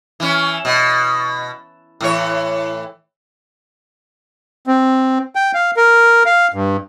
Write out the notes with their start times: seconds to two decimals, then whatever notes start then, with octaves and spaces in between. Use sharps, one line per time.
0.20 E3 C#4
0.65 B2
2.01 A2 E3 C#5
4.67 C4
5.35 G5
5.54 F5
5.77 A#4
6.26 F5
6.54 G2